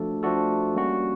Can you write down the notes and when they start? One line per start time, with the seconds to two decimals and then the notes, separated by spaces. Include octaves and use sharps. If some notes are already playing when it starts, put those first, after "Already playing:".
Already playing: F3 A3 D4 F#4 A4
0.23 F3 A3 D4 F#4 A4
0.75 G3 A#3 C#4 F#4